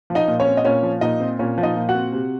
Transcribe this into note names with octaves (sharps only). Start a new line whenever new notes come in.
F3
D#4 D#5
A#2
C#4 C#5
C4
D#5
A#2 C#4 C#5
F3
A#2 D#4 D#5
C4
A#2 C#4 C#5
F3
D#4 D#5
A#2
F#4 F#5
C4
C3